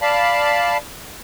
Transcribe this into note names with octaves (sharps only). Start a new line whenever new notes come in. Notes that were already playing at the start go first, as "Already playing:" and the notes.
D5 F5 A5 B5